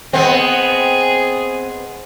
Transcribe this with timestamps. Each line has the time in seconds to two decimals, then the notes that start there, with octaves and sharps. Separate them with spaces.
0.13 B3 C4 G#4 C5 D#5 F#5